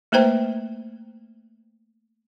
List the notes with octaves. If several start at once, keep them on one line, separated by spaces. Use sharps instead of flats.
A3 A#3 B4 C5 G5 A#5